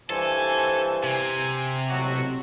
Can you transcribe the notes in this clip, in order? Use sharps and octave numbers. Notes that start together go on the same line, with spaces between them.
G2 E3 A4 C5 G#5
C3 G#5
A1 B2 F#3 F#4